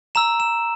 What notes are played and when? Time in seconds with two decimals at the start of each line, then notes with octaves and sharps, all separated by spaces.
0.15 A#5 E6 E7
0.40 E7